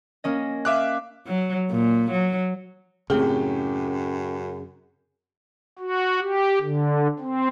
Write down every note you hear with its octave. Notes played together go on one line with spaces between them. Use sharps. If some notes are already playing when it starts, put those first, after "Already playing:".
A#3 C#4 D#5
E5 F5 D6 F#6
F#3
A#2
F#3
F#2 A2 C#3 C4 G4 G#4 G7
F#4
G4
D3
C4